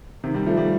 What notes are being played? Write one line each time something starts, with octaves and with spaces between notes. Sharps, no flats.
C3 D#3
D#3 G3
F3 A3
D#3 G3